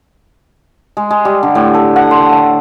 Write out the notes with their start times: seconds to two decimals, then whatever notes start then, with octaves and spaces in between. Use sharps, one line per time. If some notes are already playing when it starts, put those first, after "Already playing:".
0.97 G#3
1.11 G#3
1.25 G3
1.43 D3
1.55 A2
1.74 A4
1.96 F#5
2.11 C6
2.32 A5